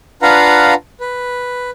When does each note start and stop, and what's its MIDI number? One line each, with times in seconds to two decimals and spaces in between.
0.22 0.74 62
0.22 0.74 65
0.22 0.74 71
0.22 0.74 77
0.22 0.74 78
0.22 0.74 82
1.00 1.70 71